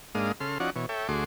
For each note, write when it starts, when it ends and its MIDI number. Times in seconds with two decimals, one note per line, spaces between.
0.15 0.32 44
0.15 0.32 56
0.15 0.32 58
0.15 0.32 62
0.15 0.32 77
0.15 0.32 87
0.40 0.58 49
0.40 0.58 69
0.40 0.58 84
0.40 0.58 89
0.60 0.70 53
0.60 0.70 61
0.60 0.70 63
0.60 0.70 66
0.60 0.70 74
0.60 0.70 78
0.76 0.86 47
0.76 0.86 52
0.76 0.86 73
0.89 1.08 69
0.89 1.08 73
0.89 1.08 76
0.89 1.08 79
1.08 1.24 38
1.08 1.24 57
1.08 1.24 66
1.08 1.24 68
1.08 1.24 84
1.08 1.24 86